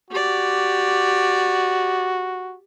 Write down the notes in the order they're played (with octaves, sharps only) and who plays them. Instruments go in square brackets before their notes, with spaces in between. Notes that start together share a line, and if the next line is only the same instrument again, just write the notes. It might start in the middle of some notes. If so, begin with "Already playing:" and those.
[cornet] F#4 [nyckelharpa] G4 D5